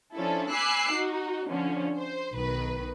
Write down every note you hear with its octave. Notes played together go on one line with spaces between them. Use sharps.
F3 C#4 D4 E4 A4
G#5 B5 D6 E6 F#6 C7
D#4 F#4
D3 F3 C#4
C5
B1 D#3 B4